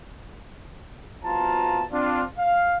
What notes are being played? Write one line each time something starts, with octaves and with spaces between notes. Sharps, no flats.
C2 B2 F3 F4 A5 A#5
C4 D4 F4
F5